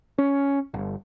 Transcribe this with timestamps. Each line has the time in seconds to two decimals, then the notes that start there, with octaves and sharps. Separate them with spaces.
0.18 C#4
0.74 G1